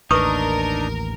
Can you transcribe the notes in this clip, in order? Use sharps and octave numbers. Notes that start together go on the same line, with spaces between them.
A1 D#2 D4 D#4 A#4 B4 C#6 D#6